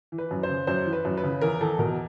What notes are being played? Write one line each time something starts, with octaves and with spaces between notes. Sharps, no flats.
E3
B4
F#2
C5
C#3
F#2 C5
E3
B4
F#2
B4
C#3
E2 A#4
E2 A4
B2 A#4